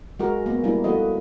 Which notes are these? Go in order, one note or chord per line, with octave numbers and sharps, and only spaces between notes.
G#3 F#4 A#4
A#3 B3
G3 A#3 D4 E4
F3 A3 F#4 B4 D#5